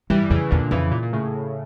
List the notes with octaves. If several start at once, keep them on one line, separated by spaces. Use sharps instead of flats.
G2 E3 G3
F2 C#3 E3
E2 A#2 D3
F2 C#3 E3
A#2
A#2
A2 C#3